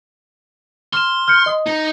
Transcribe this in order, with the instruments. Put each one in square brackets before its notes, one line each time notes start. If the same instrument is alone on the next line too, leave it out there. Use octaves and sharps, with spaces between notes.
[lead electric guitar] C6 [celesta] F6 E7
[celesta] F6 G6 C#7
D#5 D#6
[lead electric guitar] D#4